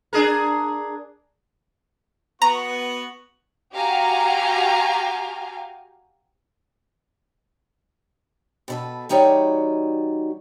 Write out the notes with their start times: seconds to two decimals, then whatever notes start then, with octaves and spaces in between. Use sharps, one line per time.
0.13 D4 G#4 A#4
2.42 B3 F#4 F#5 A#5 C#6
3.74 F#4 G4 F5 G5 G#5 A#5
8.68 B2 A4 B4
9.09 E3 G3 D#4 F#4 C#5 D5